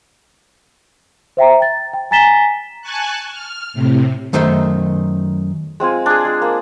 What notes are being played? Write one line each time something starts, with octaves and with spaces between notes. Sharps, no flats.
C5 E5 G5 A#5
G5 A6
G5
G#5 A#5 A6 B6 E7 G7
G#5 A5 C#6 F#6
F6
A2 C3
F#2 D#3 A3 C5
G#3 C4 F4 G#5
D4 G#4
G#3
A#3